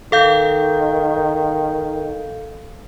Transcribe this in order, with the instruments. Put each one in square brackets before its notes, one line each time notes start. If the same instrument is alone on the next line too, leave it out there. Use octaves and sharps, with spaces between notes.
[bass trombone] D#3 [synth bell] A4 F5 G6